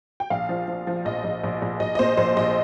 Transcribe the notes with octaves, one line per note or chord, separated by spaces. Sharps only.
G5
A#1 F5
F3
F3
F3
A#1 D#5
A#1
A#1
A#1
A#1 D#5
D#5
A#2 C5
A#1 C5
A#1 D#5